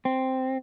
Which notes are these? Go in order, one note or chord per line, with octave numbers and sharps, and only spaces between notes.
C4